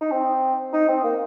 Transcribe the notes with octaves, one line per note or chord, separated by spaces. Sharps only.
D#4
C4
D#4
C4
A#3